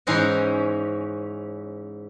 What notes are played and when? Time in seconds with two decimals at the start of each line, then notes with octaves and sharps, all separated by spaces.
0.07 G#2 E3 C#4 C5 D#5 F#5